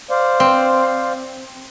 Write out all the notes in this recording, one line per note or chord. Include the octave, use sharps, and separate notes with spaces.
C5 D5 F5
C4